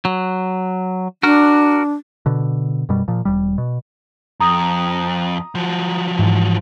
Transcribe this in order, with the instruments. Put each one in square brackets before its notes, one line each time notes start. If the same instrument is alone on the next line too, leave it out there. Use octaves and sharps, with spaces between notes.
[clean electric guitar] F#3
[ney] D4 [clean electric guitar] F#4 A#4
[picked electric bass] B2 D3
F#2 B2 G3
A#2 F3
E1 G3
B2
[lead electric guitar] F2 [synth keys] A#5 D#6
[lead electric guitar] F3 F#3
[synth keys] G#2 E3